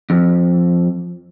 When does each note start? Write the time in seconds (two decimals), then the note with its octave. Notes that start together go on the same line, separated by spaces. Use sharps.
0.10 F2